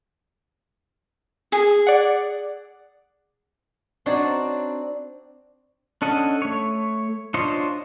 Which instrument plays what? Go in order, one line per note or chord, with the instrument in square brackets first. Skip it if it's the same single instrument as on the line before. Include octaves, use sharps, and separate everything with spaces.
[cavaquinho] G#4
[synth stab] D5 F#5
[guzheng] C4 D4 D#4 F#4 C#5 D5
[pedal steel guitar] C#4 D4 A4 D#5 F#5
A3 C#5
D4 F4 C5 C#5 D#5